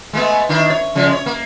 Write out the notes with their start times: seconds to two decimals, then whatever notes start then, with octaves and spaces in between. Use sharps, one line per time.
0.13 G#3 A3 B3
0.49 D#3 D4 E4
0.70 C#5
0.95 C#3 F3 G#3
1.12 C#5
1.26 A#3